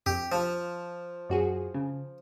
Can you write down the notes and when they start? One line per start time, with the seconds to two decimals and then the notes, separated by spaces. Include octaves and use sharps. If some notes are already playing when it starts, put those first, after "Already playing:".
0.06 F2 G4
0.32 F3
1.29 F#2 F#4 G#4
1.74 C#3